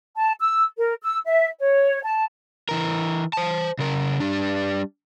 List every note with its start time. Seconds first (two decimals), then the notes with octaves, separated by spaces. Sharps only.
0.16 A5
0.40 E6
0.78 A#4
1.03 E6
1.26 E5
1.59 C#5
2.03 A5
2.69 E3 A#4
3.33 C5 A5
3.79 C#3 A#4
4.20 G3 D4